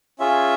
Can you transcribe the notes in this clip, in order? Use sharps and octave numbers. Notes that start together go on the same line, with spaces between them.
C#4 F4 G#4 E5